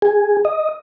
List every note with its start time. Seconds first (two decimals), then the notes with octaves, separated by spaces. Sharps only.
0.02 G#4
0.45 D#5